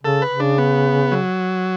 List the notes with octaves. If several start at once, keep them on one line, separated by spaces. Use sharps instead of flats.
C#3 A4
B4
C#3
D4
B3
F#3